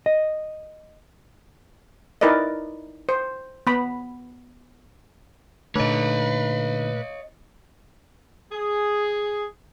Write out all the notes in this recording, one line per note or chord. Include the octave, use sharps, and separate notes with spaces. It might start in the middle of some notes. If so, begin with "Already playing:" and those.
D#5
D#4 E4 A#4 B4 D5 D#5
C5
B3 B5
A#2 D3 A3 D#4 B4 C#5 D#5
G#4